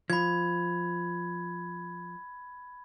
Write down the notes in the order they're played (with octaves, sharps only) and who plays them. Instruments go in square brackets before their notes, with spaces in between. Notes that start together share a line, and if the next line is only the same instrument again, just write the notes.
[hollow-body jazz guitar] F3 [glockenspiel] B5 G#6